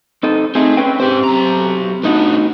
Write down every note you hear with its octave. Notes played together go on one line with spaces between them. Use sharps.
C4 D#4 A4
A3 C4 D#4 G#4
C#4 B4 G5
G#2 C4 G4 C5
B1 A#5
A2 B3 D4 D#4 F#4